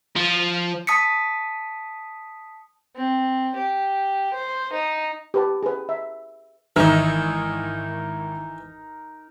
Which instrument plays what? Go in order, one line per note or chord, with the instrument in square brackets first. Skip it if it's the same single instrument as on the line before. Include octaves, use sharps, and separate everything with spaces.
[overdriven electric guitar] F3
[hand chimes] A5 D#6 B6 C#7
[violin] C4
G4
C5
D#4
[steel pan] G4 B4 A5
G#4 B4
E5
[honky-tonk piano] G#1 D#3 E6 [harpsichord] E3 [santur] D#4 A#4